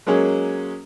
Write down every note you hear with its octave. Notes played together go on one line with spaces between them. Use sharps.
F#3 G#3 A#3 C#4 G#4